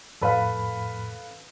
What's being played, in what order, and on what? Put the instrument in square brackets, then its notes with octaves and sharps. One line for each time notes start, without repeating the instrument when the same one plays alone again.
[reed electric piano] F2 A2 B5 [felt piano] A4 B4 F5